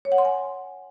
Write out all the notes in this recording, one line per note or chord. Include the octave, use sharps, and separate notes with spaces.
C#5
F#5
C6
G#5